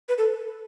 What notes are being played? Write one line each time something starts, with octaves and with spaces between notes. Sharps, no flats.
B4
A4